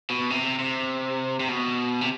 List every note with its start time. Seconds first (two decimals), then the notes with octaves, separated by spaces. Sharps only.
0.10 B2
0.30 C3
0.59 C3
1.40 C3
1.48 B2
2.01 C3